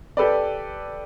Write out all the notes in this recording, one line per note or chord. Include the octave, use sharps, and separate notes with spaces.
G4 A4 B4 D5